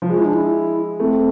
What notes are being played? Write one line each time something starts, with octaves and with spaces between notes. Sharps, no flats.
F3
G#3 F4
E4
D4
E4
A3 C4